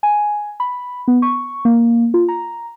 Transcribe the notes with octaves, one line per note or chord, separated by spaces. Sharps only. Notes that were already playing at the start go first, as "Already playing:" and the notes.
G#5
B5
B3
C#6
A#3
F4
A#5